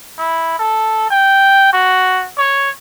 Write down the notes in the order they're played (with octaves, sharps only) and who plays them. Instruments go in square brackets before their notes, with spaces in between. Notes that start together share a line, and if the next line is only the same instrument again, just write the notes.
[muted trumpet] E4
A4
G5
F#4
C#5